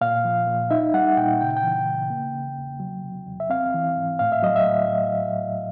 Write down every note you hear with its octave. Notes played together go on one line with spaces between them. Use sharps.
A#2 F5
F3
A#2
D#4 E5
G3 F#5
A#2 G5
C#3 G5
G5
E3
C#3
A#3
C#3
E2
F#3
C3
E2
E5
C4 F5
E3
G#2
A2 F5
E5
F#3 D#5
E5
A2